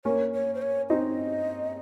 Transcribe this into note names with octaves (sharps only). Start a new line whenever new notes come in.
A#3 C#4 C#5
C#5
C5
C#5
C4 D#4 D#5